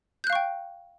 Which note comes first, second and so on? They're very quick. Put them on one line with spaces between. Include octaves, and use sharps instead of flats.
G6 F#6 F5 C#6 G5